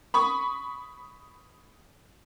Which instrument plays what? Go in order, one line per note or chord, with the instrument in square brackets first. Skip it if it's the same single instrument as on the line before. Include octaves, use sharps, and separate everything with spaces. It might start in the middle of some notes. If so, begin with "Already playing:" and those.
[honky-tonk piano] B5 C#6 D#6